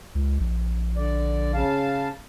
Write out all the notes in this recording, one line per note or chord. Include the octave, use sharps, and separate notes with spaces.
C#2
A#1
D3 D5
C#3 F5 A5